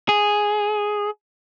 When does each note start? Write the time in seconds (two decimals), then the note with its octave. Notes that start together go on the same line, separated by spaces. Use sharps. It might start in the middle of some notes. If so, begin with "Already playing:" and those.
0.09 G#4